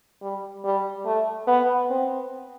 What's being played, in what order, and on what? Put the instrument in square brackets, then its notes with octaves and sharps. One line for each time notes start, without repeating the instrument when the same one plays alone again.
[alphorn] G3
G3
A3
B3
C4